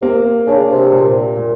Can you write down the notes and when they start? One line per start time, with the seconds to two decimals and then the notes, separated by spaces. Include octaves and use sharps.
0.02 C3 A#3
0.47 C#3 D4
0.70 C3
0.93 A#2
1.37 A#2